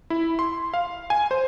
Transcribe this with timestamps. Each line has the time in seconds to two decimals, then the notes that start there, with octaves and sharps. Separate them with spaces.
0.10 E4
0.39 C6
0.74 F5
1.10 G#5
1.31 C5